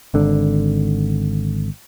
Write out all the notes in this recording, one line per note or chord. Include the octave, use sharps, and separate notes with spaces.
G#1 D3